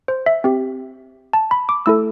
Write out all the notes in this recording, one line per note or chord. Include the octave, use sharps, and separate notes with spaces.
C5
E5
C4 G4
A5
B5
D6
A3 E4 A4 E6